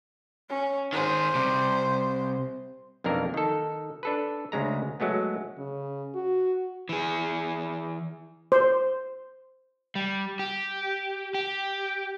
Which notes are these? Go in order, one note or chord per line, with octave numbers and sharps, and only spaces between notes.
C#4
D#3 G#4 C5
C2 C3
B1 F2 A#3 D4 A#4
D#3 A4
D4 A4 B4
D2 C#3 G#3 A#5
F#3 G#3 A3 B3
C#3
F#4
E3 G#4
C5
G3
G4
G4